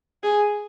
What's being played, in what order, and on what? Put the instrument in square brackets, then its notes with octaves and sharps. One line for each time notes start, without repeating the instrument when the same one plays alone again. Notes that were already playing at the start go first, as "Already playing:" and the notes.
[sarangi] G#4